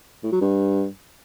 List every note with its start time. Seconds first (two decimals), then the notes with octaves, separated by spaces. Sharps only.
0.23 A2
0.32 F#3
0.41 G2